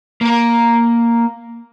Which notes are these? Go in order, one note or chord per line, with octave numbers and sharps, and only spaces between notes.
A#3 A#4